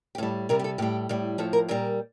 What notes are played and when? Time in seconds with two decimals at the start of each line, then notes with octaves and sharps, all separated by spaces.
0.15 G4
0.18 A2 G3 A4
0.49 C3 G3 A#4
0.59 G4
0.64 A4
0.78 A2 G3 G4
1.09 A2 G3
1.38 A2 F3 A4
1.53 A#4
1.68 A#2 G3 A#4